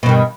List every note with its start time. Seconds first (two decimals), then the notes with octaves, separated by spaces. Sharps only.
0.03 B2
0.06 G2
0.09 D#3